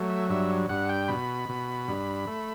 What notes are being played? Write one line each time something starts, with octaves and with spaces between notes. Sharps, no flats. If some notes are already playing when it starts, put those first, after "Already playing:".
Already playing: F#3 A3
E5
G2 E5
G2 F#5
G5
B2 B5
B2
G2
A3